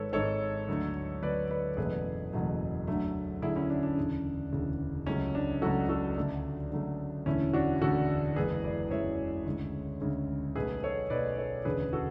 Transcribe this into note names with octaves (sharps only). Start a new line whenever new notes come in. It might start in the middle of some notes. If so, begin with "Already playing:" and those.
Already playing: G#1 G#2 G#3 A4 B4 C#5
G#1 G#2 G#3 A4 C#5
D2 D3 F#3 A3
D2 D3 F#3 A3 B4 D5
B4 D5
F#1 E2 B2 F#3 A3 G#4 B4
F#1 E2 B2 F#3 A3
D2 D3 F#3 A3
D2 D3 F#3 A3 E4 G#4
C#4 E4
D4
D4
E1 D2 C#3
E1 D2 C#3
C#2 C#3 F#3 A3 C#4
D4
C#2 C#3 F#3 A3 F#4 A4
F#4 A4
D2 C#3 F#3 A3 D4
D2 C#3 F#3 A3
E1 D2 D3 A3 C#4 E4
D4 F#4
E1 D2 D3 A3 F#4 A4
F#1 E2 C#3 E3 G#3 G#4 B4
B4 D5
F#1 E2 C#3 E3 G#3 C#5 E5
D2 C#3 G#3
D2 C#3 G#3
B1 B2 A3 G#4 B4
A4 C#5
B1 B2 A3 B4 D5
A4 C#5
E1 D2 C#3 G#4 B4
F#4 A4